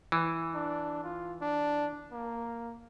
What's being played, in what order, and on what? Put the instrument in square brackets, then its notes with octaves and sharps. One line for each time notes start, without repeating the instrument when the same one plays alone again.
[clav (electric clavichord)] E3
[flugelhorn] D4
F4
D4
A#3